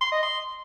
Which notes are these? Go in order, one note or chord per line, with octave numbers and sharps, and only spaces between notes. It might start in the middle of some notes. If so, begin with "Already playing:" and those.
C6
D#5
C6